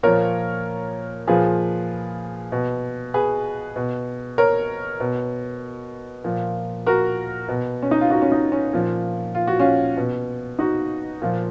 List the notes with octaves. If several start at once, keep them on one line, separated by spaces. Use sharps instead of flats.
A#2 F3 A#4 C#5
A#2 F3 G#4 B4
B2
G#4 B4
B2
A#4 C#5
B2
A#2 F3
F#4 A#4
B2
C#4
D#4
F4
D#4 F#4
C#4
D#4
C#4
A#2 F3
F4
F#4
C#4 F4
B2
D#4 F#4
A#2 F3